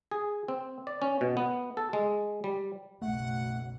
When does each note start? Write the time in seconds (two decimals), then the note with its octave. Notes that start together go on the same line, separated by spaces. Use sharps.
0.11 G#4
0.48 C4
0.87 D5
1.02 C#4
1.21 B2
1.37 B3
1.77 A4
1.93 G#3
2.44 G3
3.02 F#1 B1 A3 F#5